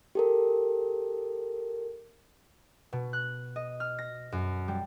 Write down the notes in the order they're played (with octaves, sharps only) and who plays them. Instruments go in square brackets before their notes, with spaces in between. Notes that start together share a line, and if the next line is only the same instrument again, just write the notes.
[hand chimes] G4 A4 A#4
[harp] B2
F#6
D#5
F6
A#6
F#2
G3